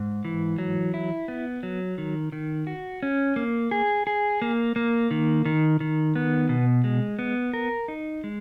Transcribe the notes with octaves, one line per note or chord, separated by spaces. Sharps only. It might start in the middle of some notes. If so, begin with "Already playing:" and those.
Already playing: G#2
E3
F#3
E4
B3
F#3
D#3
D#3
F#4
C#4
A#3
G#4
G#4
A#3
A#3
D#3
D#3
D#3
B3
B2
G#3
B3
A#4
D#4
G#3